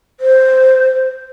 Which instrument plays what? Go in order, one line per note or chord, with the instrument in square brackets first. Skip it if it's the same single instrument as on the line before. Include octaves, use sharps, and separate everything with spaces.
[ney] C5